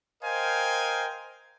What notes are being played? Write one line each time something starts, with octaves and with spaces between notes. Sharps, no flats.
A#4 C5 D#5 F5 G5 G#5